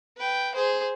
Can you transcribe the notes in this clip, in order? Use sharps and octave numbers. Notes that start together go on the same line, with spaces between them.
B4 G5
G#4 C5